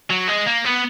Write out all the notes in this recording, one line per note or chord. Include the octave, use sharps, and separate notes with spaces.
F#3
G#3
A#3
B3